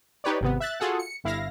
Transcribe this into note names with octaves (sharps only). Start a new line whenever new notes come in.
D#4 G4 B4 C#5 D5
G#1 C3 B3
E5 F#6 A6
F4 F#4 G#4 A4 F#5
C#7
G1 E4 F5 A#6